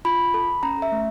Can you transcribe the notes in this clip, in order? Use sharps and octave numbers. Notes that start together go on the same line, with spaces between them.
F4 B5
A4
C#4 A#5
E5
A3